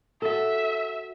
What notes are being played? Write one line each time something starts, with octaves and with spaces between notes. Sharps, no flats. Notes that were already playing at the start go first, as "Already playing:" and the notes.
F#4 A4 E5